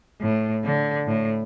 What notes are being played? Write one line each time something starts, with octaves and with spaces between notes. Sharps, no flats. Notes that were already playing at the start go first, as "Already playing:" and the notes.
A2
D3
A2